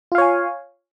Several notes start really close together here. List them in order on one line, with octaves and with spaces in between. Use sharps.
F4 F5 C#5 G#5